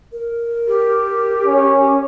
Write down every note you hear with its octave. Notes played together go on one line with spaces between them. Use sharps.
A#4
G4
C#4